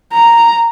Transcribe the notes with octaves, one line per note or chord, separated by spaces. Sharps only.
A#5